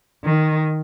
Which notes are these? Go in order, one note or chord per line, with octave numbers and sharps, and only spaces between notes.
D#3